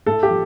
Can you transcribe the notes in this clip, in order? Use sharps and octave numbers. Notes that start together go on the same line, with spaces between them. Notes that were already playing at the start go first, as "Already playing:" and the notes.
A2 A4
G4
F3